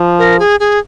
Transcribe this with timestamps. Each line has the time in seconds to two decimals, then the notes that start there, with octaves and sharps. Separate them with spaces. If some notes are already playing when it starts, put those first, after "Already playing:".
Already playing: F3
0.19 A#4
0.39 G#4
0.60 G#4